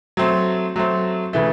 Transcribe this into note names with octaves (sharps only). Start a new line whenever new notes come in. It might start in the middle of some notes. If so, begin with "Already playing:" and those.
F#3 A3 C4
F#3 A3 C4
C#3 E3 A3